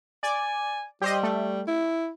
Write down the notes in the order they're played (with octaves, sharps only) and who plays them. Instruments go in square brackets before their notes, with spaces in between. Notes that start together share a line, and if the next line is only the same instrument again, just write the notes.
[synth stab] D5 [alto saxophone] G#5
[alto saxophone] G3 [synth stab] G4 C5 D#5
[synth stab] A3
[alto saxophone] E4